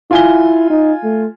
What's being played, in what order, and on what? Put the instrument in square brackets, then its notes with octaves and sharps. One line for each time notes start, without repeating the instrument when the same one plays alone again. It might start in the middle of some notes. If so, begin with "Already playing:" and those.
[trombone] E4 [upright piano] F4 G#5 G7
[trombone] D#4
A3